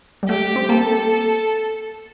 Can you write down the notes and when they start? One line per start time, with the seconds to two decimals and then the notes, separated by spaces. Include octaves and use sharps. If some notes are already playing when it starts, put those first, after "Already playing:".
0.23 G3
0.29 A3 G4
0.56 C4
0.69 A#3 A4